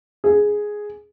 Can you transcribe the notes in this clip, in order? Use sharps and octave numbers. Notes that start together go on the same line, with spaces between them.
G#4